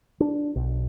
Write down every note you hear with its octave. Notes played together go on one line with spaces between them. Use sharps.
D4
B1